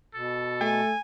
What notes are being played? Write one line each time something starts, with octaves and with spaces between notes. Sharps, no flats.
B2 A4
A3 G#5